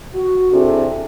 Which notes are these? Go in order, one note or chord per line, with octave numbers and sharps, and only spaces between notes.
F#4
C3 D4 E4 G#4 A4